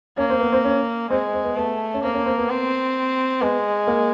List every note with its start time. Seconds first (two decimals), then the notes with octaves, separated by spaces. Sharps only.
0.18 A#3 C#4
0.30 C4
0.40 B3
0.52 C4
0.64 C#4
1.10 G#3 C4
1.33 C4
1.45 B3
1.57 A3 B3
1.94 C#4
2.03 A#3 C4
2.14 C#4
2.26 C4
2.38 B3
2.49 C4
3.41 G#3 B3
3.87 A#3